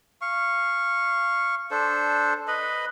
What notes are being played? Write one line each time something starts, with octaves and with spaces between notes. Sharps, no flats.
F5 C#6
D4 A4 C5
B4 D#5 B5